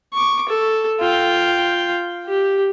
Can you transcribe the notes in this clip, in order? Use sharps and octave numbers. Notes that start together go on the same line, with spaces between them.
C#6 D6
A4
F4 G5
G4